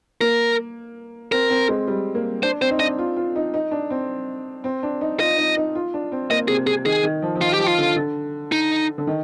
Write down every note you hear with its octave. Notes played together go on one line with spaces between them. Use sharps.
A#3 A#4
C4 A#4
C4
G#3
G3
A#3
D4 C5
C4 C5
D#4
D4 D#5
F4
F4
D#4
D#4
D4
C4
C4
D4
D#4
F4 D#5
D#4
D#4
F4
D4
C4
A#3 D#5
C3 G#4
C3 G#4
D#3 G#4
D#3
F3
F3
D#3 F4
G4
F3
F4
D3
D3
D#4
D3
D#3